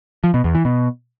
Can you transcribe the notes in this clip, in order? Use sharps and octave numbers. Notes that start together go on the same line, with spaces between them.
F3
B2
E2
E3
B2